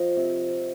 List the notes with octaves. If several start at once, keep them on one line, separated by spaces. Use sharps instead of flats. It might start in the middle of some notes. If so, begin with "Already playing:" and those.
Already playing: F3 D#5
C3